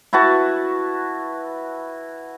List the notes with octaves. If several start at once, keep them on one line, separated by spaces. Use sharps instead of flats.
E4 F#4 B4 A5